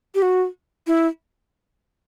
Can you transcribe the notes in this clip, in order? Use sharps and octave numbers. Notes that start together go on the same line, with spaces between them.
G4
F#4
E4